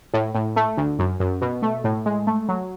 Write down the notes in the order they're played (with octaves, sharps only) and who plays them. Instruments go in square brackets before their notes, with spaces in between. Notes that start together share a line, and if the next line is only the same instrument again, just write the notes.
[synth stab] A2
A2
A3
D2
F#2
F#2
B2
A3
A2
G#3
A3
F#3